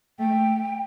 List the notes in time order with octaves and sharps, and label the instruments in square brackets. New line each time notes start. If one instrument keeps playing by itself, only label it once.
[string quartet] A3 [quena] G5